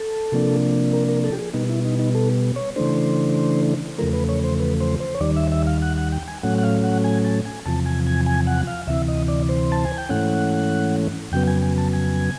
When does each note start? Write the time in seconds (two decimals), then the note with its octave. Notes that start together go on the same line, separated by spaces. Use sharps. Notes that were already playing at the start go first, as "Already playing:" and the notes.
Already playing: A4
0.32 C3 F3 A#3 D4
0.93 A#4
1.09 A#4
1.24 A4
1.32 G4
1.39 G#4
1.53 B2 G3 B3 D#4
1.69 E4
1.85 D#4
1.99 D#4
2.15 A4
2.56 C#5
2.76 C#3 E3 A3 D4 C5
3.98 E2 C#3 F3 A3 A#4
4.13 B4
4.29 C#5
4.44 C5
4.60 B4
4.80 C5
5.00 C5
5.15 C#5
5.20 D#2 D#3 G3 D5
5.37 E5
5.52 E5
5.67 F5
5.82 F#5
5.98 F#5
6.12 G5
6.28 G#5
6.43 A2 F#3 A3 C#4 F#5
6.58 F#5
6.63 F5
6.84 F#5
7.04 G#5
7.25 A5
7.45 G#5
7.66 E2 C3 F3 A5
7.86 G#5
8.07 G#5
8.26 G#5
8.47 F#5
8.67 F5
8.87 D2 C3 E3 E5
9.08 D#5
9.28 D5
9.49 C5
9.72 A5
9.85 G#5
9.98 G5
10.09 G#2 E3 A3 C#4 F#5
11.32 F2 C#3 F#3 B3 G5
11.47 G#5
11.62 G#5
11.78 A5
11.93 G#5